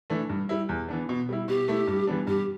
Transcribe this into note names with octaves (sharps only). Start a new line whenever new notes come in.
E3 A3 D4
G2
G3 E4
E2
E3 B3 D4
B2
G3 E4
B2 G4
A3 E4
G2
E3 G3 B3 D4
G2 G4